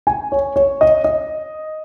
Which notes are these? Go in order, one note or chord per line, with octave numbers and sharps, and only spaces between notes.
G#5
C#5
C#5
D#5
D#5